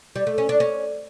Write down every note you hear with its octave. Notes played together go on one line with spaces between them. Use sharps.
G3
A3
C#4
D4
C#4